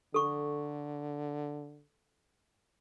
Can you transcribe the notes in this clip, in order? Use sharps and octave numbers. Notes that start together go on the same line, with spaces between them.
D3 A4 C#6